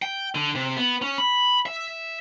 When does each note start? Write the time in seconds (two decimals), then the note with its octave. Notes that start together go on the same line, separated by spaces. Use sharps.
0.02 G5
0.35 D3
0.55 C3
0.76 B3
1.02 C#4
1.18 B5
1.66 E5